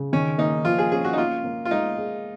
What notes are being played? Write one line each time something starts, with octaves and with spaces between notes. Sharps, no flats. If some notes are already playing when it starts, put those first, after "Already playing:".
Already playing: C#3
D#3 C#4
A#3 D#4
F3 F4
G#4
C#4 G#4
F#4
D#4
A#3 F4
A#3
F4
G#3 D#4
G#4